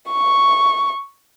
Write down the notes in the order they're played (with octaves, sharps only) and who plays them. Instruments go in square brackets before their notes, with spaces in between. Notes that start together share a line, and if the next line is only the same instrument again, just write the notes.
[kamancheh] C#6